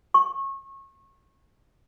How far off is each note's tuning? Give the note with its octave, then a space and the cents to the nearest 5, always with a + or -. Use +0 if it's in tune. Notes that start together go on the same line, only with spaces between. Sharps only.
C#6 -30